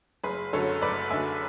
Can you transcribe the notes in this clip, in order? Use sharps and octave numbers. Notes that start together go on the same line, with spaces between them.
F#1 G#4 B4
F#2 D3 F#3 A4 C#5
F#1 B4 D5
F#2 D3 F#3 E5 G#5